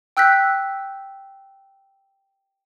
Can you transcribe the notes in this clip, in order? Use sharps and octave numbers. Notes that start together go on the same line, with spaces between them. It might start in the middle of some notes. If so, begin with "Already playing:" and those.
G5 E6 F#6 G6 B6